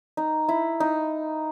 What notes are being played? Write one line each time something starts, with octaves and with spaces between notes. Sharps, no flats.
D#4
E4
D#4